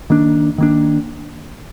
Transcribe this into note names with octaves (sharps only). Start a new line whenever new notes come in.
D#3 A#3 D4
D#3 A#3 D4